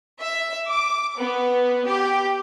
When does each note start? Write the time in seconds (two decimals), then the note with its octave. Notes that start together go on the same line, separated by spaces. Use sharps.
0.20 E5
0.67 D6
1.18 B3
1.86 G4